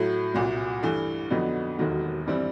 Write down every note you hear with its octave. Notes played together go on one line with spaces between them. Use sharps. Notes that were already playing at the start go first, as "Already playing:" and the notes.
Already playing: A2 F#3 A3
C2 A#2 F#3
G2 E3 A3
F2 D3 F#3 B3 D#4
E1 D#2 D#3 F#3 A3
G2 E3 G3 C4 E4